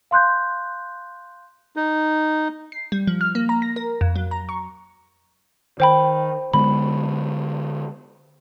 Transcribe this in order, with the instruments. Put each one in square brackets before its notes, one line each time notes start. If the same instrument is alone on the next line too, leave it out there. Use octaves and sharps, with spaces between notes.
[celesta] F5 C6 F#6 G6
[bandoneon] D#4
[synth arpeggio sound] C7
G3
F3
F6
A#3
A#5
A#6
A#4
F2
F#3
A#5
C#6
[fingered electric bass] D#3 [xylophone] C5 G5 B5
[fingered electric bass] D3 G#3 B3 [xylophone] B5